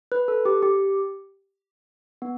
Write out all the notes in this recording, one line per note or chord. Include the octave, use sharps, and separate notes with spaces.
B4
A4
G4
G4
B3